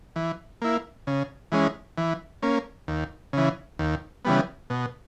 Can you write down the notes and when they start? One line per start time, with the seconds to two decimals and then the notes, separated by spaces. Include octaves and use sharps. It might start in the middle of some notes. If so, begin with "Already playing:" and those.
0.16 E3
0.62 A#3 E4
1.07 C#3
1.52 E3 G#3 C#4
1.98 E3
2.43 A#3 C#4
2.88 D#2
3.33 C#3 E3
3.79 D#2
4.25 C#3 E3 G3 B3
4.70 B2